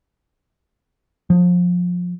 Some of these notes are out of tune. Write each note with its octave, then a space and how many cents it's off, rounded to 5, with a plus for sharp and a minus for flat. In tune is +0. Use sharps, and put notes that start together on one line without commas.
F3 +25